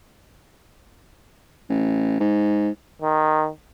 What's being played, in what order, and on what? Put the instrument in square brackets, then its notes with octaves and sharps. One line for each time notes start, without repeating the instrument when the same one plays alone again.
[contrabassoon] A1
G#2
[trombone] D#3